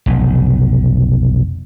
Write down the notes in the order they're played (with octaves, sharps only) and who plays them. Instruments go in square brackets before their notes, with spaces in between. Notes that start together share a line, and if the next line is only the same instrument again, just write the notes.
[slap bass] F1 B1